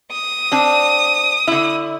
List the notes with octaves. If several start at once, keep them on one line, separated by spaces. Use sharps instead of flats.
D#6
C4 D4
D3 E4